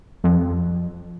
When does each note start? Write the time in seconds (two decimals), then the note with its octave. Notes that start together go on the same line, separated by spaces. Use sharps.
0.24 F2